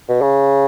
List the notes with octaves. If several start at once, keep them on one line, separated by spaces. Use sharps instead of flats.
B2
C#3